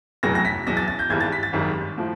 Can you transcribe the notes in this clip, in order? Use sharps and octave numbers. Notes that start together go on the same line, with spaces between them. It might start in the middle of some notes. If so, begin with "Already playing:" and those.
F1 E2 B2 F#3 A#6
A#6
B6
E2 B2 F#3 A#6
A6
A6
G6
G#1 G2 E3 G3 G#6
A6
B6
A6
G#1 F#2 D#3 G3
A2 F3